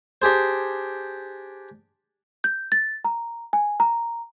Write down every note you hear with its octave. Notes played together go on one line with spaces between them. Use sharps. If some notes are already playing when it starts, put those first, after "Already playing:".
D4 G4 G#4 C5
G6
A6
A#5
G#5
A#5